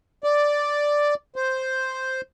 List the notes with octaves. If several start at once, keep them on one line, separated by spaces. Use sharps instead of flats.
D5
C5